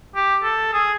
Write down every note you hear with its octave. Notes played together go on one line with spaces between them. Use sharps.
G4
A4
G#4